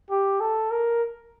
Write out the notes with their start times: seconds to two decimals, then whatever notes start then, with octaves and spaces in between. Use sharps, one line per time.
0.11 G4
0.41 A4
0.71 A#4